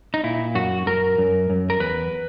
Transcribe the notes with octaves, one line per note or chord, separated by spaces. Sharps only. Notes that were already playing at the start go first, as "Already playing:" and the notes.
D#4
A#2 E4
F#2 F#4
F#2 A#4
F#2
F#2
A#4
E2 B4